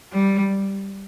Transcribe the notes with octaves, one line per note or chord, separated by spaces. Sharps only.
G3